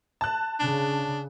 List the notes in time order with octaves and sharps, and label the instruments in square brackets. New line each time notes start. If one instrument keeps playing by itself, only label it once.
[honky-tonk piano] A5 F#6
[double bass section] C#3 [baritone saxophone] D4